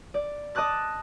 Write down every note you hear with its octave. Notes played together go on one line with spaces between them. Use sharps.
D5
D#5 A5 D6 F#6 A6